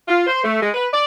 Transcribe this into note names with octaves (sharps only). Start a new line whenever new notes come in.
F4
C5
A3
G#3
B4
D5